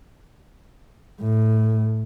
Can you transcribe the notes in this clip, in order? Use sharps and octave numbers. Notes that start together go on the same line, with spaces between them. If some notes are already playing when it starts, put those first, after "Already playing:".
A2